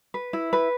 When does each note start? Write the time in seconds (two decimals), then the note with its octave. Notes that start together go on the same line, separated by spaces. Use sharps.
0.14 B4
0.33 E4
0.53 B4